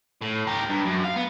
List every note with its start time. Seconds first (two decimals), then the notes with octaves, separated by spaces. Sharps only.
0.21 A2
0.47 G4 A#4
0.69 G2
0.85 F#2
1.04 F5
1.16 B3